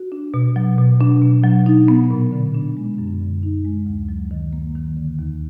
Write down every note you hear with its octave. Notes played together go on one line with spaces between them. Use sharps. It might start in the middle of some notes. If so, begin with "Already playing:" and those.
Already playing: F#4
D4
B2
F#3
B2
D4
B2
F#3
D#4
B3
A#2
D3
D4
G#3
F#2
D3
D#4
G#3
D2
F#3
D#3
A#3
D#3
D3
D#2